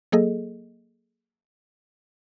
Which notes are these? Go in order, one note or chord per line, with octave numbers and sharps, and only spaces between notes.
F#3 A#3 G#4 A4 D#5